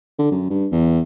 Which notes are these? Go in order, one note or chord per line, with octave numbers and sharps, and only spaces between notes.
D3
F#2
G2
E2